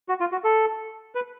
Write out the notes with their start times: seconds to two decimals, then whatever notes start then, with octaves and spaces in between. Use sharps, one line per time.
0.09 F#4
0.20 F4
0.32 F#4
0.44 A4
1.15 B4